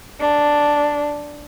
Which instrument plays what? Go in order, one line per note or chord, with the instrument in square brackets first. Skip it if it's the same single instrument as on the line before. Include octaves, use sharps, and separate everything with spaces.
[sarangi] D4